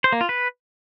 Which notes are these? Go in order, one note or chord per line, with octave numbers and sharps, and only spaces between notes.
C5
A#3
F4
B4